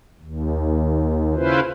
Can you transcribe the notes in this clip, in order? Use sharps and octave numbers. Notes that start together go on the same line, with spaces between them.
D#2
C#3 C#4 E4 F4 B4 C5